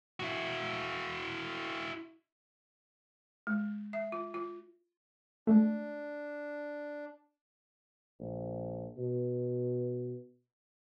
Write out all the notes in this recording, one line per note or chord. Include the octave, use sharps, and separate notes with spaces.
E4 F#4
G#3
E5
F4
F4
G#3 A3 D4
A#1
B2